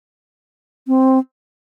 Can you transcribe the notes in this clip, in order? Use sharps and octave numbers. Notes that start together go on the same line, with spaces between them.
C4